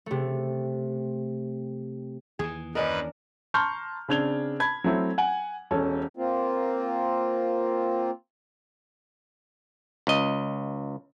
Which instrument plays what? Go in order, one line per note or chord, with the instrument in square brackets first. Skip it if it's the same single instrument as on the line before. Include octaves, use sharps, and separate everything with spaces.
[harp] C3 A3
[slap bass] D#2 E3 [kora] G#4
[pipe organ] F#2 B4 B5 [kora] C#4 D4 A#4 [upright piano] D#5
[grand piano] A5 A#5 C6 C#6 F6 G6
C#3 C4 D4 G#6 F7 G7
A5 B5 G#6
F#3 A3 C4 E4
F#5 G#5 F#7
E1 C#4 A4
[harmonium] A#3 C4 F4
[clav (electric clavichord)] C#2 D#5